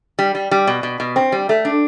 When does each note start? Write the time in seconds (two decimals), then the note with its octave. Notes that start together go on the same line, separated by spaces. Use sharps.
0.19 G3
0.35 G3
0.51 G3
0.67 B2
0.83 B2
1.00 B2
1.16 C4
1.32 G3
1.49 A3
1.65 D4